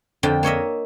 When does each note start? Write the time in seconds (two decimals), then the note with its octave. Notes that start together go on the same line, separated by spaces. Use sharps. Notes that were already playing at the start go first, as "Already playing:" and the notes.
0.23 F2 D3 F3 G5
0.43 A#3 C#5 D#5 E5